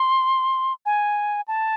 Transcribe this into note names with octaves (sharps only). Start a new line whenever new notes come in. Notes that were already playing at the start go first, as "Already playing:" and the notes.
Already playing: C6
G#5
A5